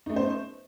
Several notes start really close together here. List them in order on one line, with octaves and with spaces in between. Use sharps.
D#4 A3 C#4 C5 B3